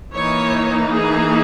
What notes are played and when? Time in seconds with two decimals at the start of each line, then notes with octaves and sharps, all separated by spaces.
0.14 E3 A#3 D#4 C#5
0.93 G#4